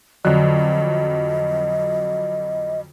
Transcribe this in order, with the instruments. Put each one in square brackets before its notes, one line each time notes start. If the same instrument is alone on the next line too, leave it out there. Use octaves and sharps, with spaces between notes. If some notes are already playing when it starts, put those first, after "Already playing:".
[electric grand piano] F2 F#3 [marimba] D3 [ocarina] D#5